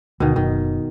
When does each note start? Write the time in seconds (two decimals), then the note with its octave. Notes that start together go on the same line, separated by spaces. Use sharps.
0.20 D2 B2 D#3
0.36 F#1 D#3